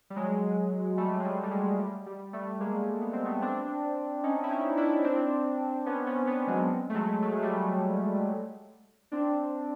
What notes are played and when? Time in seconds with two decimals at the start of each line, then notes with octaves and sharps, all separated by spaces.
0.10 G3
0.16 F#3 G#3
0.97 G3 A3
1.20 G#3
1.25 G3 A3
1.43 G3
1.51 F#3 G#3
1.80 G3
2.06 G3
2.33 G3 A3
2.60 G#3 A#3
3.01 B3
3.13 C4
3.25 A3 B3
3.42 C4 D4
4.23 C#4 D#4
4.43 E4
4.51 C#4 D#4
4.77 D4 E4
5.04 C4 D4
5.86 B3 C#4
6.06 B3 C#4
6.27 B3 C#4
6.47 F#3 G#3
6.90 A3
6.94 F#3 G#3
7.22 A3
7.32 G#3
7.42 G3 A3
9.12 C4 D4